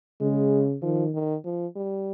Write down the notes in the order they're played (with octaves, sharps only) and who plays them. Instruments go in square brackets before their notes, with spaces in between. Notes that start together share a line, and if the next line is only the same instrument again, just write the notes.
[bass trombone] C#3 [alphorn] G#3
[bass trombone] D#3 [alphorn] F3
[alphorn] D#3
F3
G3